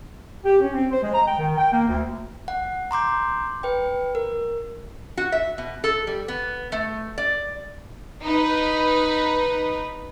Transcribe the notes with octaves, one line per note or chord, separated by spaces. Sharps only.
G4
C#4
C4
C5
G#3
A#5
G5
D#3
G5
A#3
D2
F#5
A#5 C6 D6 G6
B4 G5
A#4
F#4
E5
B2
A4
G3
B3
A3
D5
D#4 B4